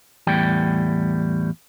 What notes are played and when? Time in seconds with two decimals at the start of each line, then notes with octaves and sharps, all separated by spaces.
0.27 E2 A2 G3 G5